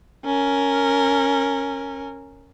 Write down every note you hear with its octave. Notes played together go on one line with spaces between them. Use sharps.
C#4 A#4